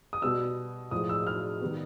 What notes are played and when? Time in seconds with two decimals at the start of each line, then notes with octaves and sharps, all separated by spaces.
0.13 D#6
0.22 B2 G3 B3 E6
0.91 A2 F3 G#3 D#6
1.09 E6
1.27 F6
1.61 D#3 G3 B3